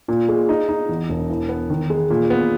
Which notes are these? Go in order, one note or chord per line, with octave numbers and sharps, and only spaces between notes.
A#2
G#3
D#4
D#4
E2
E1
E3
B3
D#3
G#3
A#2
B3